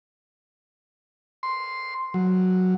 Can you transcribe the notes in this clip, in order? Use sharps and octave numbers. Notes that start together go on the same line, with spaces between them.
C6
F#3